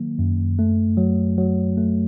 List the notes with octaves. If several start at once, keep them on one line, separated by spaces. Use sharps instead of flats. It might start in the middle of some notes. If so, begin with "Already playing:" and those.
Already playing: D#3 F#3 A#3
F#2
A3
F#3
F#3
A3